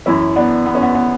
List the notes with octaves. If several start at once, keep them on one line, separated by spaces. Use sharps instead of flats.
F#2 E3 C#4 E4
B3 D4
B3
C#4
B3
B3